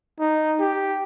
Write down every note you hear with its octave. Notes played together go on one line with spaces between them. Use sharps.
D#4
G4